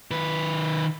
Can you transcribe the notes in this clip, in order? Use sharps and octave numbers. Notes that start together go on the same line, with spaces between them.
D#3 B4